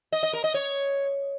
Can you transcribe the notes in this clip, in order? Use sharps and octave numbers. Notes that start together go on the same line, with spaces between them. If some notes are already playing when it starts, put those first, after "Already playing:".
D#5
D#5
A#4
D#5
C#5